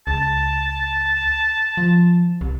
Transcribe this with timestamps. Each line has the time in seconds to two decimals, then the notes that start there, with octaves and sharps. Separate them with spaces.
0.07 C#2 A5
1.77 F3
2.41 C2